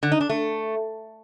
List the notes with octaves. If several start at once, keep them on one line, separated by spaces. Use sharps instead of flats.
D3
D#4
D4
A3